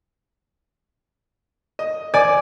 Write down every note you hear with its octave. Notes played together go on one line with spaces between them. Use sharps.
D#5
D5 G#5